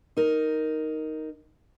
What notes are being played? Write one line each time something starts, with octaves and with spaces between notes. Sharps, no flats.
D#4 A#4